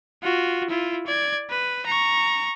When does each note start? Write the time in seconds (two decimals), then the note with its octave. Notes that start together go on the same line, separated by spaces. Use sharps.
0.23 F4 F#4
0.70 E4 F4
1.07 D5 G#6
1.50 B4
1.86 A#5 C#6